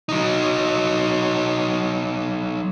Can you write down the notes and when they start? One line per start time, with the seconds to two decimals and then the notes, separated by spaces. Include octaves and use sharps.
0.09 F#3 D#4